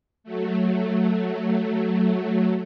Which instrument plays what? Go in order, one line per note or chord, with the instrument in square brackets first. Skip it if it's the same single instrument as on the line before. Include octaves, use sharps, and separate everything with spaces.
[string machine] F#3 A3